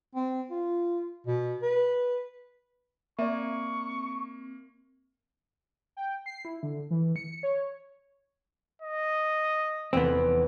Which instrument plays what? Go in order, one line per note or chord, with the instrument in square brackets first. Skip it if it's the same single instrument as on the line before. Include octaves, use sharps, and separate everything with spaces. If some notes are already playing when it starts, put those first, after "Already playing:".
[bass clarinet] C4
F4
B2
B4
[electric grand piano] A#3 [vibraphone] C4 [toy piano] D5 E5 [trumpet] C#6
[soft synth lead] G5
C7
E4
D3
E3
C#7
C#5
[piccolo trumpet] D#5
[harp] F1 E2 D#7 [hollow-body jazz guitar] B3 C4